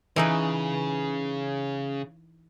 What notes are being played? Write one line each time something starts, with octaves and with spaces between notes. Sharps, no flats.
C#3 E3 D#4 B4